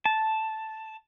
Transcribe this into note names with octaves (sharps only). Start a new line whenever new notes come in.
A5